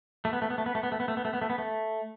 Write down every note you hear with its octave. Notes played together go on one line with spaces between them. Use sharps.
A3
B3
A3
B3
A3
B3
A3
B3
A3
B3
A3
B3
A3
B3
A3
B3
A3